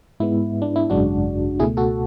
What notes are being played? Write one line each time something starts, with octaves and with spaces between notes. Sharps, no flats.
G#2 G#3 B3 E4
D4
E4
G#1 F#2 C#3 G#3 D4 F#4
C#2 B2 A3 E4 G#4
F#4 A4